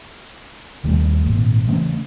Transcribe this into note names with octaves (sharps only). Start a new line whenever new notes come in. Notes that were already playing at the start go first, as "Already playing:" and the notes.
D#2 D#3 G3 A3
G#1 A#2
C#3 E3 A3 C#4